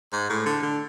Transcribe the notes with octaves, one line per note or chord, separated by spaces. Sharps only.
G#2
A2
D3
D3